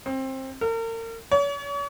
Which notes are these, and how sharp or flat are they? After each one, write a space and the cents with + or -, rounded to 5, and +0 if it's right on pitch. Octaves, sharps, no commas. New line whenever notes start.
C4 +20
A#4 -40
C#5 +40